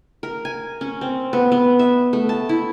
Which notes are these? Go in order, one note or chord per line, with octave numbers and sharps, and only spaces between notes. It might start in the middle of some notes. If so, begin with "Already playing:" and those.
A#4
G#5
C#4
C4
B3
B3
E5
A3
A5
E4